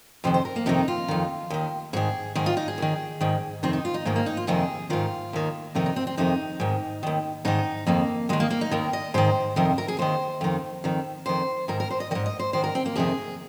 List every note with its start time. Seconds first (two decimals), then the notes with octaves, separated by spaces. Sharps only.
0.24 F2 C3 D#3 C5
0.34 C5
0.45 A#4
0.56 A#3
0.66 F2 C3 D#3 D#4
0.88 F4
1.08 F2 D#3
1.50 D#2 D#3
1.93 G#2 D#3 G#4
2.35 G#2 D#3 G#4
2.46 F4
2.57 D#4
2.68 G#4
2.78 D#2 D#3
3.21 G#2 D#3
3.63 F2 C3 D#3 C4
3.73 D#4
3.85 F4
3.94 D#4
4.05 G#2 D#3 A#3
4.16 A#3
4.26 D#4
4.37 F4
4.47 F2 C3 D#3 G#4
4.90 G#2 D#3 F4
5.33 D#2 D#3
5.75 F2 C3 D#3 D#4
5.86 D#4
5.96 C4
6.07 C4
6.17 F2 C3 D#3 D#4
6.60 G#2 D#3
7.03 D#2 D#3
7.45 G#2 D#3 D#4
7.87 F2 D#3 A#3
8.29 D#2 D#3 G#3
8.40 A#3
8.50 A#3
8.61 D#4
8.71 D#2 D#3 A#4
8.93 D#5
9.14 G#2 D#3 C5
9.56 F2 C3 D#3 A#4
9.78 A#4
9.88 G#4
9.99 D#2 D#3 C5
10.41 F2 D#3
10.84 F2 D#3
11.26 F2 D#3 C5
11.68 G#2 D#3 A#4
11.80 A#4
11.90 C5
12.00 D#5
12.11 G#2 D#3 D#5
12.26 D#5
12.39 C5
12.53 G#2 D#3 C5
12.64 A#4
12.75 C4
12.86 A#3
12.96 F2 C3 D#3 G#4